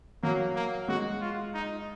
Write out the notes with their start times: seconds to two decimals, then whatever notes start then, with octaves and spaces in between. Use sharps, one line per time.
0.23 F#3 A#3
0.55 A#3
0.88 G#3 F#4
1.20 F4
1.54 D#4